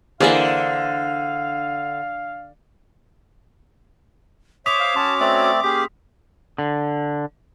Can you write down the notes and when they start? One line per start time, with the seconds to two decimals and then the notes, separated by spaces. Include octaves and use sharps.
0.20 D3 E3 A#3 G#4 C5 D5 E5 F5
4.66 C5 C#5 E5 D6 D#6 B6 F7
4.80 F5
4.96 C#4 F#4 C#5 A5 C6
5.20 A3 C4 D5
5.64 A#3 C#4 G4 G#4 B6
6.58 D3